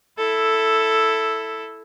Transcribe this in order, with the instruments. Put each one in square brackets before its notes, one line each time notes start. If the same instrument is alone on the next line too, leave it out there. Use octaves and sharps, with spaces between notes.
[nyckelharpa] E4 A4